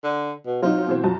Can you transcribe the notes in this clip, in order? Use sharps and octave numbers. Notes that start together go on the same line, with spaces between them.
D3
B2
F#3 C4 D#4 F4
B2 E3 C4
F#2 F3 A5